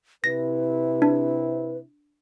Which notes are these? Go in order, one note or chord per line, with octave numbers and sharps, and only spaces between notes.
C3 E4 B4 A#6
D4